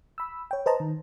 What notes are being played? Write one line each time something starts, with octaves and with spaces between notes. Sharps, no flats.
B5 E6
C#5 G5
B4 C5 D#5 A5 A#5
D#3